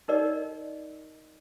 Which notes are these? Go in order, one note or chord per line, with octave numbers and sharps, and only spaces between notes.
D#4 A#4 D5 D#5